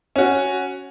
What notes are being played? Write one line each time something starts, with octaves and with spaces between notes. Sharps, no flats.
C#4 F#4